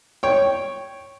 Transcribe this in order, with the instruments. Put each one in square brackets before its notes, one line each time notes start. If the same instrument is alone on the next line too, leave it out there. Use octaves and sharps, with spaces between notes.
[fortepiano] C#5 G5